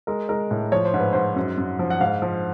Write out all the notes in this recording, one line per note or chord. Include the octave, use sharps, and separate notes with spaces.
G#3 A#4
G#3 A#4
A2
F3 C#5
C5
G#2
B4
G#2 C5
F#2
F#2
F3
F#5
G#2 F5
F3